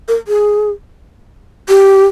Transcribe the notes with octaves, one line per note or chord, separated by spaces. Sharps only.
A#4
G#4
G4